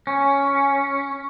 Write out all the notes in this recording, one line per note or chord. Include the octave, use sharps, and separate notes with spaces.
C#4